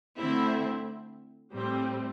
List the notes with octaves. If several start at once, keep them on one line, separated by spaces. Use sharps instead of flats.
D3 A3 C4 E4
A2 G3 C4